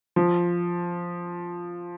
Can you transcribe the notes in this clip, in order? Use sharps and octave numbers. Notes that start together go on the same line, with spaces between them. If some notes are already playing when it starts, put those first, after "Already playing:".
F3